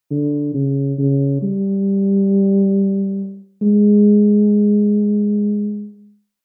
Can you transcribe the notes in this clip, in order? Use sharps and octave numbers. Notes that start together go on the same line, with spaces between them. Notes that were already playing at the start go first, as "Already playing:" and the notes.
D3
C#3
C#3
G3
G#3